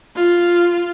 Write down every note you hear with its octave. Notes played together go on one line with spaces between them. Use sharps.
F4